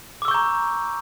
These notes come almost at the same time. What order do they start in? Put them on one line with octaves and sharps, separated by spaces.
D6 E6 C#6 G6 A#5